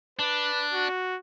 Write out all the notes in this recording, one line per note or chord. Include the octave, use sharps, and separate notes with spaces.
D4 B4
F#4